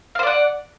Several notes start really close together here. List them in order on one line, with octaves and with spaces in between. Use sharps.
F5 C5 D5 F#5